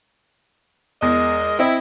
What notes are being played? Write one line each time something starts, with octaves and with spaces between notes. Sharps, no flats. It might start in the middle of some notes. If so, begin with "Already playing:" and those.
E2 G#3 A#4 D#5
C4 E4 D#5